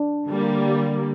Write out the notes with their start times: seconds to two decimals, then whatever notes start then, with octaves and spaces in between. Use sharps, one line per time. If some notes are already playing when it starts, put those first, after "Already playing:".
Already playing: D4
0.27 D3 G3 A#3